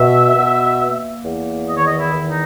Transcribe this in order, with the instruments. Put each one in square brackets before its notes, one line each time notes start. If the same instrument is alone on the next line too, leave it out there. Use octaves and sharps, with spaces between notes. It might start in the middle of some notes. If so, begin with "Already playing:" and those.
Already playing: [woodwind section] B2 E5
B2
A#3
E2
D#3 D#5
C#5
D#5
E4
E2
D#4